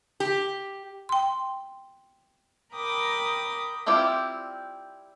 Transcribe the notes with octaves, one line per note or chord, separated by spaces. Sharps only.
G4
G5 C6
A#4 G5 B5 D6 D#6
G3 C4 E4 F4 G4